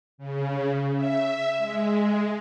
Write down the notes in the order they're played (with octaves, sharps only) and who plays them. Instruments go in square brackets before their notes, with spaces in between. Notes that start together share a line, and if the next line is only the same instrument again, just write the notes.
[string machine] C#3
E5
G#3